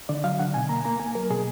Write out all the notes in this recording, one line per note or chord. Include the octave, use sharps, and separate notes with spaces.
D3 D5
F#3 F5
D3 F#5
B2 G#5
A#3 A#5
A#3 A#5
A#3 G#5
F#3 A#4
B2 G#4